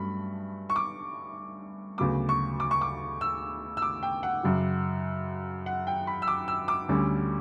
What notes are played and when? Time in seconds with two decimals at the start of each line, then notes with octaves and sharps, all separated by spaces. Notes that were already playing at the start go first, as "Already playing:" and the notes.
Already playing: G2 F#3 A3 C#4 B5
0.70 C#6
0.76 D6
1.98 D2 C#3 F#3 B3 D6
2.29 C#6
2.60 D6
2.71 C#6
2.81 D6
3.21 E6
3.77 E6
3.82 D6
4.03 G5
4.23 F#5
4.43 F#2 C#3 F#3
5.66 F#5
5.87 G5
6.07 B5
6.22 E6
6.28 D6
6.48 E6
6.68 D6
6.88 D2 D3 G3 C#4